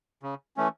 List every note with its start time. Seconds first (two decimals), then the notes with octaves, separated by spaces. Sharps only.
0.23 C#3
0.57 E3 A3 C#4